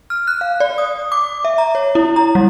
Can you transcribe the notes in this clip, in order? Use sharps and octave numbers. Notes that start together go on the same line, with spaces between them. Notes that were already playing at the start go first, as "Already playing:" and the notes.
F6
F#6
F5
D5
D#6
D6
E5
A#5
C#5
E4
A#5
G3